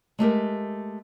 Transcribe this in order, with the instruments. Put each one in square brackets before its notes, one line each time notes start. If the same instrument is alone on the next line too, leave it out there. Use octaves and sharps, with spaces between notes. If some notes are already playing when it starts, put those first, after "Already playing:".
[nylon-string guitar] G#3 A3 G4 A#4